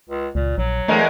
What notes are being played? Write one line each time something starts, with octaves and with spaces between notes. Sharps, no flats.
C#2
C#2 A#2
A#1 F#3
E2 G#3 A3 A#4